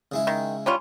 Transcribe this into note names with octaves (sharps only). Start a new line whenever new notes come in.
C#3 G#3 E4
D#3
G3 C#4 F4